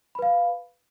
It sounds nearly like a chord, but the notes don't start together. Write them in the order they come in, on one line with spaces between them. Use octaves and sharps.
B5 B4 F5